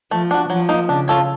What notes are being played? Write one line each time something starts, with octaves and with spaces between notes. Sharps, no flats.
F3 A3
D4 F#4
F3 F#3
A#3 D#4
C#3 D4
F4 A4 C#5